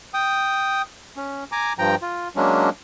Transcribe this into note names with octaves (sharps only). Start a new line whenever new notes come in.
G5 D#6
C#4
G#5 A#5 D6
G2 F3 G5 A#5
F4
F#3 G#3 A#3 C#4 D4